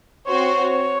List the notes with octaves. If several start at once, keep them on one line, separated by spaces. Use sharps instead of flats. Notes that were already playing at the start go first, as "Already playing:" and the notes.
C4 F#4 C5 C#5